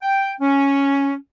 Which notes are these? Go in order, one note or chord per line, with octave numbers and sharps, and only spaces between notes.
G5
C#4